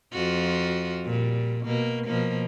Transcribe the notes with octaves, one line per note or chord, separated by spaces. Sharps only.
F2 F4 F#4
A#2 G3
B2 A#3
B2 F3 A#3